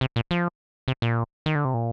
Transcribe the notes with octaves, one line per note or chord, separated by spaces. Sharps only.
C3
A#2
F3
C3
A#2
D#3
D3
C3
A#2